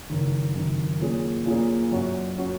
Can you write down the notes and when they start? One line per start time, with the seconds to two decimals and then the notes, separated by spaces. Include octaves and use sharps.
0.10 F#1 F#2 D#3
0.55 F#1 F#2 D#3
1.01 A#2 A#3 C#4 G#4
1.46 A#2 A#3 C#4 G#4
1.91 F#2 F#3 C#4 F#4
2.37 F#3 C#4 F#4